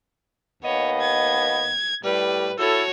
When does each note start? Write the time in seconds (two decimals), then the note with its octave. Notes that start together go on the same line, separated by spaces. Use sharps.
0.63 D#2 B3 C#5 D#5
1.00 G#6
2.04 A2 G3 B4
2.59 E4 F#4 A4 C#5